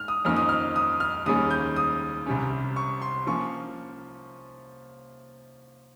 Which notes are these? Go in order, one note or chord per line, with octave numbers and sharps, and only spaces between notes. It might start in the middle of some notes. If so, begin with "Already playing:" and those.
Already playing: G#2 F6
D#6
F2 D#3 A#3 C#4 F6
D#6
F6
D#6
F6
D#2 C#3 G3 A#3 C#4 D#6
G6
D#6
C2 C3 G3 C#4
C#6
C6
F3 A#3 C#4 C#6